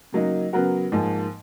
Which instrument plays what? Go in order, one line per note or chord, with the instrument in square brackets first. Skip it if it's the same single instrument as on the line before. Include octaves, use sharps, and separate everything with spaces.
[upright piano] C#3 F#3 A#3 D#4
C#3 F#3 B3 F#4 A#4
G#2 F3 A#3